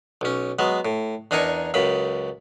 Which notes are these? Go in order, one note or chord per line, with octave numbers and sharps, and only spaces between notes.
B1 C#4
F#3 G#3 B3
A2
E2 D4 D#4 A#4 G#5 C#6
C#2 F#2 C#3 B5